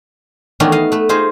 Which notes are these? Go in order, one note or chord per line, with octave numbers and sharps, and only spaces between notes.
D#3 E3 A3 B3 C#4 D4
D#5 F5
A3 B4
D#4 F4 G#4 C5